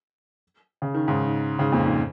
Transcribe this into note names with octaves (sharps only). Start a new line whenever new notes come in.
C#3
D#3
G#2 C#3
G#2 C#3
F2 A#2
G#2